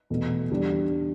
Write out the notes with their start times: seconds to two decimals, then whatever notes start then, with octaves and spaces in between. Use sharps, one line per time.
0.10 E2 B2 A3
0.51 E2 D3 G3 D4